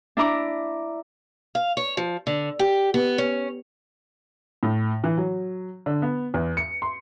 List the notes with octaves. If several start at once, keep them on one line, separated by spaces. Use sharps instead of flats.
D4 E4 A#5 D6
F5
C#5
F3
D3
G4
B3
C#4
A2
E3
F#3
D3
B3
E2
C#7
C6